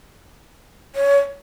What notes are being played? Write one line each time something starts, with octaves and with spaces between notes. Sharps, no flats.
C#5